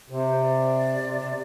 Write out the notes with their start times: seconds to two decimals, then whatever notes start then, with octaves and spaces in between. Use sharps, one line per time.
0.10 C3 C5
0.26 C5
0.42 D5
1.04 C3
1.21 C3